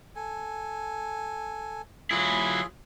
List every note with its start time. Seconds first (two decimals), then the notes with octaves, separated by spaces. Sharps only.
0.16 A4 G#5
2.11 F#3 E4 F4 G#4 G#5